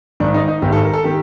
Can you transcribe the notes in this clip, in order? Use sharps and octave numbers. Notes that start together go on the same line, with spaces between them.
G#1 G#2 D#3 D4
D#4
D#4
G#1 G#2 D#3 G4
A4
A#4
A4
D#3 G4